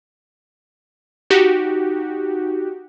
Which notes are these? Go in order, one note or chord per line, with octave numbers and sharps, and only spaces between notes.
D#4 F#4 G4